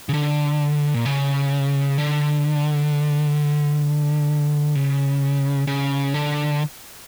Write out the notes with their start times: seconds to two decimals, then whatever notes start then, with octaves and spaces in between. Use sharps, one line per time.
0.09 C#3
0.14 D3
0.94 A#2
1.05 C#3
1.98 D3
4.75 C#3
5.67 C#3
6.14 D3